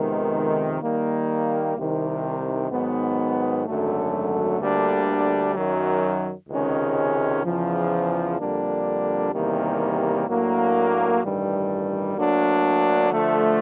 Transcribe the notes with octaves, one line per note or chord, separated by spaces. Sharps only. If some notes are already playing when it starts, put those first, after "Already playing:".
Already playing: F2 C3 D#3 G#3 B3
D#3 G3 A#3
C2 C3 D#3
G#2 D#3 F#3 B3
G#1 F#2 D3 F#3 A3
D2 D3 G3 A#3 D4
F#2 D#3 F#3
C#2 C3 D#3 G#3 C#4
E2 C#3 F3
F2 D3 G3 A#3 D4
E2 C3 D#3 G3 A#3
A2 F#3 A#3 D4
A1 G2 D#3 G3
D2 D3 F#3 A#3 D4
D3 F3 A3